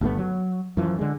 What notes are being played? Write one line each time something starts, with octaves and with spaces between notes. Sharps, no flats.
G1 G2 A3 B3
F#3
F#2 E3 F3
D3 G#3